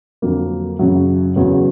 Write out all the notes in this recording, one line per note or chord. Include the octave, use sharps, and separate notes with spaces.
F2 D3 F#3 A#3
F#2 C#3 F#3
E2 C#3 F#3